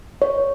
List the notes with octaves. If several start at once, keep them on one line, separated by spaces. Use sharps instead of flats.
C#5